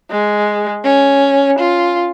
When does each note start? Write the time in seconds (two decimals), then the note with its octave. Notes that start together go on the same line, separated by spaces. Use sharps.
0.11 G#3
0.84 C#4
1.59 F4